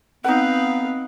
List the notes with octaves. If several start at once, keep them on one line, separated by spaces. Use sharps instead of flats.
B3 C4 D#4 B4 F5 F#5